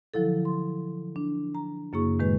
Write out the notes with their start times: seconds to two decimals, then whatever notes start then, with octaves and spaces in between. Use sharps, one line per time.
0.14 D3 F3 F#3 E4 A4
0.45 C6
1.16 D4
1.55 A#5
1.93 F#2 C#3 A#3 E4 G#4 C#6
2.19 A2 D#3 G#3 B4